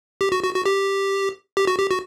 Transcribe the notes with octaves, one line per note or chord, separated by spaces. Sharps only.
G4
F#4
F#4
F#4
G4
G4
F#4
G4
F#4